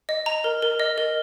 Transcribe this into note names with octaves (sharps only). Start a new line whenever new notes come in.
D#5
A#5
A#4
A#4
D#5
A#4